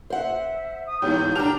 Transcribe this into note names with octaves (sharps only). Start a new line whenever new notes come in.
C5 E5 F#5
D#6
G2 E3 B3 G4 G6
D4 G4 A5 A#5 F6 F7